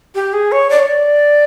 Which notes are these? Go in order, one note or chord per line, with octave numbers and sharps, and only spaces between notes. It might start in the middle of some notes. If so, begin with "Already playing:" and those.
G4
G#4
C#5
D5
C#5
D5